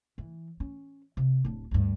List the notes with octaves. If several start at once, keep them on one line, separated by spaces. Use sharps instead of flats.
E3
C#4
C3
D1 D4
D2 G2